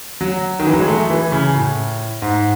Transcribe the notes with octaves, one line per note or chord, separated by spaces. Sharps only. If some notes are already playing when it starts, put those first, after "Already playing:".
F#3
D#3
E3
F#3
G#3
A3
E3
C#3
A2
G#2